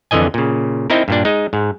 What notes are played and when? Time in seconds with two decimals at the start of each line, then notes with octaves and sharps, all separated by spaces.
0.11 F2 D3 E3 D#5 G#5
0.34 A#2 C#3
0.90 C4 D#4 E4 A#4
1.08 G2 A#2 D4
1.25 G#3 D#4
1.53 G#2